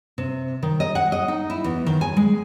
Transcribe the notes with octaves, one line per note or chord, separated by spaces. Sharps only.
C3
D#3
D#5
F#5
D#5
D#4
E4
E2
D#3
G#5
G#3